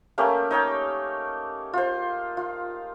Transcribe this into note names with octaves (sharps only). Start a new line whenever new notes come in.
A3 A#3 C#4 G4
D#4 C#5 G5
F4 C5
F4